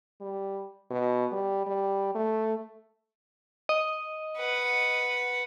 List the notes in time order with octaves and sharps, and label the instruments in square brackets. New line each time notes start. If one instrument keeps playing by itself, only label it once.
[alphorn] G3
B2
G3
G3
A3
[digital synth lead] D#5
[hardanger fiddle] B4 F#5